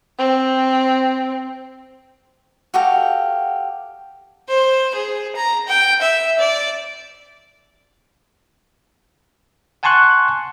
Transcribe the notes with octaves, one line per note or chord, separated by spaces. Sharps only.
C4
F#4 G4 A4 F5
C5
G#4
A#5
G5
E5
D5
F#5 G#5 A5 C6 C#6 F#6